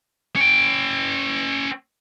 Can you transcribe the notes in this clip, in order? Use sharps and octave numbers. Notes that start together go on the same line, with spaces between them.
C#4 G5